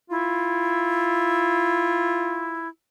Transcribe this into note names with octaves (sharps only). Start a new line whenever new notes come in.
E4 F4